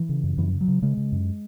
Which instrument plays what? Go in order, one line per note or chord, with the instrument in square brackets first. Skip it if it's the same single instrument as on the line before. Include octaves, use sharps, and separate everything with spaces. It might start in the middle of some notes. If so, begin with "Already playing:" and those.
Already playing: [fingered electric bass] E3
C#3
F#2
F#2 E3
C#3
F#3
C#3
C#3 G#3
C#3
F#2